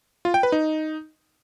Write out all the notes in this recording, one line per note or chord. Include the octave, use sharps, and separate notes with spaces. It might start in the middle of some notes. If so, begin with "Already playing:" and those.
F4
G5
B4
D#4